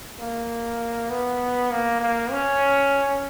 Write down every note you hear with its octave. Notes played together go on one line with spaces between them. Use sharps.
A#3
B3
A#3
A#3
C#4